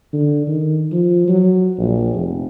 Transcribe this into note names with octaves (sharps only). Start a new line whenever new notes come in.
D3
D#3
F3
F#3
A#1
F1